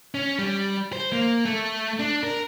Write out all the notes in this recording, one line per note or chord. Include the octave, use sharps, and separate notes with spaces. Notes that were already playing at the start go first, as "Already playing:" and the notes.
C#4
G3
C5
A#3
A3
D4
A#4